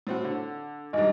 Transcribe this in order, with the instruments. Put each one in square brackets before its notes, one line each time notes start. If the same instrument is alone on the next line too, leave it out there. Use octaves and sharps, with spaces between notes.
[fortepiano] A2 C4 F#4
D3
[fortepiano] G#1 G2 [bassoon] D#4